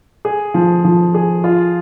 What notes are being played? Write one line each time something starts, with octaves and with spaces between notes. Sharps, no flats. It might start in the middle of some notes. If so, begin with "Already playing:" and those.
G#4
F3
F3
G#4
F4